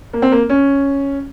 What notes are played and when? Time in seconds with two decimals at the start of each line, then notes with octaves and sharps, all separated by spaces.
0.13 A#3
0.22 C4
0.32 A#3
0.50 C#4